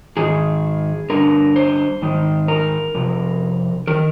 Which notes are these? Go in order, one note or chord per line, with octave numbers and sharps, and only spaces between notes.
G#2 D#3 G#4
G2 D3 A#4
C5
G#2 D#3
A#4
F2 C3
D#3 A#4